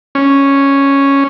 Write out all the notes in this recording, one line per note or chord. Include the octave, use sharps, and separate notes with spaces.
C#4